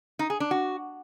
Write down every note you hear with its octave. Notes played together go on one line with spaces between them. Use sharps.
D#4
G#4
D4
F#4